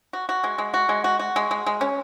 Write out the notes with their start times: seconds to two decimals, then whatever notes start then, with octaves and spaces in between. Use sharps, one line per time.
0.13 F#4
0.29 F#4
0.44 G#3
0.58 G#3
0.74 F#4
0.89 G#3
1.04 F#4
1.19 F#4
1.36 G#3
1.51 G#3
1.66 G#3
1.81 C#4